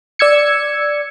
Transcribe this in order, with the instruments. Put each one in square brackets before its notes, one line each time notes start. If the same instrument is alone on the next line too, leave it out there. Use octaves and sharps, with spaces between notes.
[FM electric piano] D5 E6 G#6 C#7